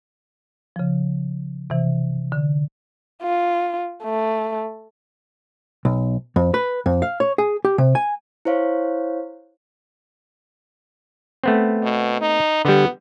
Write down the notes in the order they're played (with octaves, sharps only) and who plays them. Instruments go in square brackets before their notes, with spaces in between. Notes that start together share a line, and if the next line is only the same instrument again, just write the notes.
[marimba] C#3 F3
C3 E3
D3
[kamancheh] F4
A3
[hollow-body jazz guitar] B1
F2
B4
F2
F5
C#5
G#4
G4
C3
G#5
[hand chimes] E4 C5 C#5 F5
[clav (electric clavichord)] A3 B3 C4
[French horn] B2
D#4
[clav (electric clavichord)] D3 G3 [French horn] B3